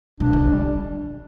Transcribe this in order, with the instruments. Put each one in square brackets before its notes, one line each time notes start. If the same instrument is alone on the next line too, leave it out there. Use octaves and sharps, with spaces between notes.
[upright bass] B2 [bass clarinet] D4
[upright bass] D3
D3
[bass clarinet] G3